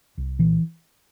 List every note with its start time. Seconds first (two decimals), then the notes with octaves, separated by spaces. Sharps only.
0.17 C2
0.39 A#2 E3